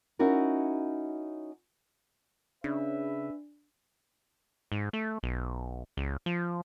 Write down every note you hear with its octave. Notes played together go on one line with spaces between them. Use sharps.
C#4 D#4 E4 F#4 A#4
C#3 D4 B4 E5
G#2
A3
B1
C#2
F3